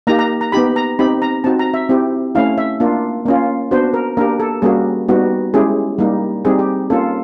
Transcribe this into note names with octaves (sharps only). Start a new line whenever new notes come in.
A#3 D#4 G4 A#5
A#5
A#5
B3 D#4 G4 B5
A#5
C4 D#4 G4 B5
A#5
C4 D#4 F#4 A5
A#5
E5
C4 E4 G4
A3 C#4 E4 F5
E5
A#3 D4 F4
A#3 C#4 F4
B3 D4 F#4 C5
A#4
A#3 D4 G4 A#4
A4
G3 A#3 C#4 F#4 G#4
G3 B3 D#4 F#4
G#3 C#4 E4 G4 G#4
G3 A#3 D#4
G3 C4 D#4 G4 G#4
G4
A#3 C#4 F4 A4